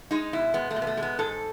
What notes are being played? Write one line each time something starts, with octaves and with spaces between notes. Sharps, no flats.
G#3 D#4
B2 E4
G#3 B3
A3
B2
B3
A3
G#3
B3
G#2 A4